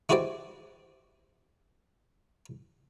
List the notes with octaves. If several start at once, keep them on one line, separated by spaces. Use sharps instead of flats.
G#3 E4 F#4 G4 C5 D5